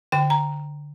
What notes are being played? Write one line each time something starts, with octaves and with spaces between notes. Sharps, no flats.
D3 G5
A#5